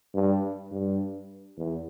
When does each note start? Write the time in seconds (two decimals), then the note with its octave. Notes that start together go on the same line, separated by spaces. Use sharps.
0.14 G2
0.71 G2
1.58 E2